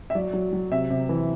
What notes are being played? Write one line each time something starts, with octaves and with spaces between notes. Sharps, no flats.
E5
F#3 D5
F#3
F#3
C3 E5
C3
E3